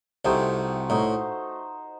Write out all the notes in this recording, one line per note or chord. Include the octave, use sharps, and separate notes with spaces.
C2 C3 A3 D#4 F#4 C5
A2 A3 D#4 F#4 C5